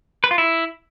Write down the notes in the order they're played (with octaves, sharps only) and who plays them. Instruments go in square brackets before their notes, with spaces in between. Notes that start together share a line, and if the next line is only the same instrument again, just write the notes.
[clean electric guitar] B4
F4
E4